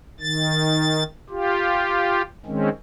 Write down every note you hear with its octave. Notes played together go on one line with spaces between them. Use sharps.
D#3 A6
F4 G4
D#3 G#3 C4 C#4